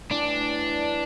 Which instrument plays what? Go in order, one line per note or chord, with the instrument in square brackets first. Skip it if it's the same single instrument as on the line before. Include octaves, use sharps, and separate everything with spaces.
[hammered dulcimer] A2 E3 G3 [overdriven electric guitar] D4